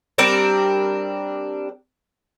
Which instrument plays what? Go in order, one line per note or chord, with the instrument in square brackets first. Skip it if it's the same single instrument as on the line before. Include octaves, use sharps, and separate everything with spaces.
[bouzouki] G3 C4 D4 A#4